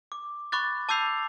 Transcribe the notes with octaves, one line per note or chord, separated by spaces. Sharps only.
D6
B5 C#6 D6 F#6 A6
A5 D6 E6 G6 C7 F7